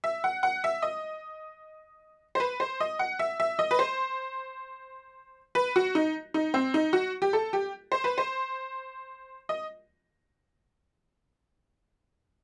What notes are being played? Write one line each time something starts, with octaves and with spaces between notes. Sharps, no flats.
E5
F#5
F#5
E5
D#5
C5
B4
C5
D#5
F#5
E5
E5
D#5
B4
C5
B4
F#4
D#4
D#4
C4
D#4
F#4
G4
A4
G4
C5
B4
C5
D#5